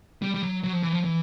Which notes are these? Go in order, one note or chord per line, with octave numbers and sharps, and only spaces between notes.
G3
G3
F#3
F#3
F3
E3
F3
E3